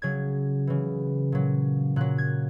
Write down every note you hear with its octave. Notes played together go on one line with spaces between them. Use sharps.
C#3 F#3 G#6
C#3 E3
A#2 F#3
A#2 F#3 F#6
G#6